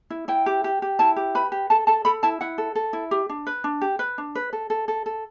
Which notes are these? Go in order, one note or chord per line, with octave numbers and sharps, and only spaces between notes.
E4
E4 G5
G4
G4
G4
E4 A5
G4
B4 B5
G4
A4 A5
A4 A5
A4 B5
E4 A5
E4 F#5
A4
A4
E4
G4
D4
B4
D4
G4
B4
D4
B4
A4
A4
A4
A4